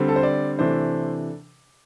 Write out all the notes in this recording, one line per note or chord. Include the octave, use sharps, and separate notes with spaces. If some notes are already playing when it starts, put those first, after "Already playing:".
Already playing: D3 G3 C4
A4
C5
D5
C3 E3 A3 D4 C5